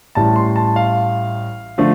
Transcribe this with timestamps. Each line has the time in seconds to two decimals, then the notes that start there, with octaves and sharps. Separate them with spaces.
0.15 A1 A2 G3 A5
0.36 C6
0.56 A5
0.76 F5
1.78 D3 F3 A3